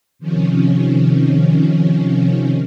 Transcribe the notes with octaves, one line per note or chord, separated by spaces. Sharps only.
C3 D#3 F3 C#4